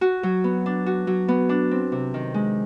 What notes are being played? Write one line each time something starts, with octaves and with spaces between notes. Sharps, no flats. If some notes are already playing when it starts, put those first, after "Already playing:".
F#4
F#3
B3
D4
F#4
F#3
B3
D4
C4
C3
D#3
G#3